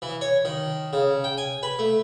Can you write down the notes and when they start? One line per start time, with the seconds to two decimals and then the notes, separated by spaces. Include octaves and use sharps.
0.02 E3
0.21 C#5
0.45 D#3
0.93 C#3
1.24 G5
1.38 G#5
1.63 B4
1.79 A3